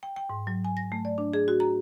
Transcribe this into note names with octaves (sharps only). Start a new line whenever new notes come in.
G5
G5
G#2
F#3
G#5
A#6
A3
D5
D4
G#4
F#4
A#5